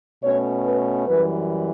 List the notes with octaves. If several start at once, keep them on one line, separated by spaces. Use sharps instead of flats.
B2 A3 C#4 C#5
B4
F#2 E3 G3 B4